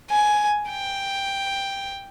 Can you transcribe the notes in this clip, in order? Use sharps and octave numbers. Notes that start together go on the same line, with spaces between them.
G#5
G5